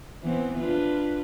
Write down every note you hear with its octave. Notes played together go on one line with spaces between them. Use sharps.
E3 B3 C4
D4 F4 B4